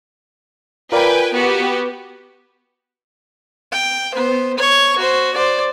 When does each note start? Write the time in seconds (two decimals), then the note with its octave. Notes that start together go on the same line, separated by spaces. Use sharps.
0.92 F4 A#4 B4 D5 G5 G#5
1.32 B3 F#4 G4
3.72 G5
4.14 B3 C5
4.58 C#5 C#6
4.98 F#4 C5
5.34 C5 D5